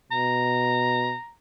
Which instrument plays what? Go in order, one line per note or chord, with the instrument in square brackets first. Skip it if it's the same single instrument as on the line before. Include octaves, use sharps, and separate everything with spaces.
[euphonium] B2 [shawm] A#5